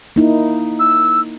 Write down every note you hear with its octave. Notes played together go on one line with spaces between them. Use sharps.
A#3 D#4 E4
E6